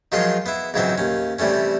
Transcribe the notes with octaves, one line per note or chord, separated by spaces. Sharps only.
D#3 F3 F#3 G#3 F4 C6
B3 E4
C#2 G#2 E3 F#3 B3 C4
D#2 C#4
C3 E3 G3 A3 C#4